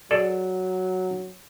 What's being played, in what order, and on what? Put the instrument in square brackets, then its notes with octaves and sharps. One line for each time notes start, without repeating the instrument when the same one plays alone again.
[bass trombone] F#3 [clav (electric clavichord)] G#4 A4 D5